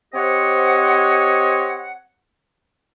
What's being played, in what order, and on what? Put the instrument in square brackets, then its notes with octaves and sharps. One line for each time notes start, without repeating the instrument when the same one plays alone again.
[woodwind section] C4 G4 C5 C#5 D#5 F#5